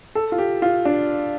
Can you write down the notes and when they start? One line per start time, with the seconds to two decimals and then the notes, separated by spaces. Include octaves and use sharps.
0.15 A4
0.32 F4
0.38 G4
0.62 F4
0.85 D4